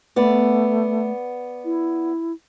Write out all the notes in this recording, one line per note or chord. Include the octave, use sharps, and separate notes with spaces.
A3 B3 D5
E4